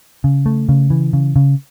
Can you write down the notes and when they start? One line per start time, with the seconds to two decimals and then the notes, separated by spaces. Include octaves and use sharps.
0.24 C#3
0.46 A3
0.69 C#3
0.90 E3
1.13 C#3
1.36 C#3